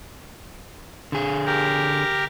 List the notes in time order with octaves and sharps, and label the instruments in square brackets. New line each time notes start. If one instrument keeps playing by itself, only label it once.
[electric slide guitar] D3 G#4
[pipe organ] G4 A#4